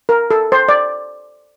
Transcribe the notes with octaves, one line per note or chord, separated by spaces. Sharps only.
A#4
A4
C5
D5